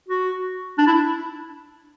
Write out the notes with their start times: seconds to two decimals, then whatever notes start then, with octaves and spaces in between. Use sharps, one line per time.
0.08 F#4
0.78 D4
0.87 E4